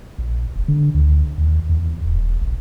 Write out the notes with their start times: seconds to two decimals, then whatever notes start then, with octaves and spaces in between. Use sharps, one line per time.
0.18 A#1
0.56 F1
0.68 D3
0.94 D2
1.38 D#2
1.69 E2
2.05 D#1
2.42 A#1